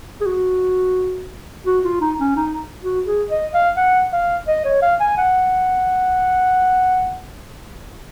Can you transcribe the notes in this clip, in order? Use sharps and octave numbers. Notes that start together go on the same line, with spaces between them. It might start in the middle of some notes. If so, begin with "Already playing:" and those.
G#4
F#4
F#4
F4
D#4
C#4
D#4
F#4
G#4
D#5
F5
F#5
F5
D#5
C#5
F5
G#5
F#5